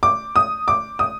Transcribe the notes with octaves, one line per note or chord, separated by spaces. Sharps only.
D6
D#6
D6
D#6